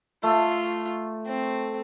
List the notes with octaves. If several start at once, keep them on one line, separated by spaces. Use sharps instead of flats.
A3 F4
C4